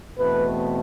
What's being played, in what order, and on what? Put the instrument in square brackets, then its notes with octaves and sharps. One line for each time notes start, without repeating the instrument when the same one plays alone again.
[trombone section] E2 B2 A3 C4 B4